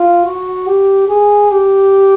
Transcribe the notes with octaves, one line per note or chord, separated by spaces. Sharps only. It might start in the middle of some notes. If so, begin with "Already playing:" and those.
Already playing: F4
F#4
G4
G#4
G4